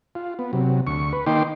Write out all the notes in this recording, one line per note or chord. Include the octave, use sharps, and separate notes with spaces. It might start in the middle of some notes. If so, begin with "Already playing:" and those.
F4
B3
C3 F#3
D2 C#6
B4
D#3 A#3 D#4 G5 C6 D6